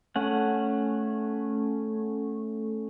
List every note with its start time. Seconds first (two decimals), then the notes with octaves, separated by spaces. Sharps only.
0.16 A3 C#4 F#5